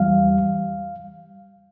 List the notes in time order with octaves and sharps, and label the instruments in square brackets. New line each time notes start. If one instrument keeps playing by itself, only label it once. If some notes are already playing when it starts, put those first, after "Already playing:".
Already playing: [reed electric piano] E2 E3 G3 F5